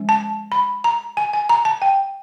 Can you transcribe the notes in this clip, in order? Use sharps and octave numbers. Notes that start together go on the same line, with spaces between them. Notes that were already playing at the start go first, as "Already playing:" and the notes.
Already playing: F3 G#3 C#4
A5
B5
A#5
G#5
G#5
A#5
A5
G5